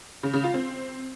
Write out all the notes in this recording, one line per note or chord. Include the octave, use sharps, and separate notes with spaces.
C#3
C#3
F4
C4